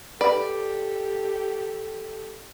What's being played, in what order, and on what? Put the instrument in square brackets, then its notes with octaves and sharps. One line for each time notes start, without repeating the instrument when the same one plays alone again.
[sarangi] G4 [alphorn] A4 [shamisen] B4 [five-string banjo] D5